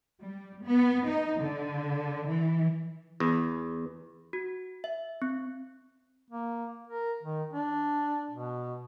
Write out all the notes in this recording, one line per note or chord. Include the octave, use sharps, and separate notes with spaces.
G3
B3
D#4
D3
E3
E2
F#4
E5
C4
A#3
A#4
D#3
D4
B2